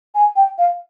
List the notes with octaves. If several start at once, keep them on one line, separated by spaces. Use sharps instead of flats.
G#5
G5
F5